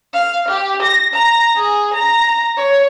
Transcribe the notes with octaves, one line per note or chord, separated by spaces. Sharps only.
F5
G4
A#6
A#5
G#4
A#5
C#5